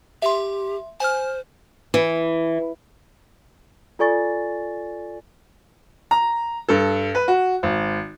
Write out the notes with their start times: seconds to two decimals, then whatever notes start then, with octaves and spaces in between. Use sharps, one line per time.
0.22 G4 E5 C6
1.00 C5 G#5 F6
1.94 E3
3.99 F4 A4 D5 G#5 C#6 A6
6.11 A#5
6.69 G2 A4
7.15 B4
7.28 F#4
7.63 G#1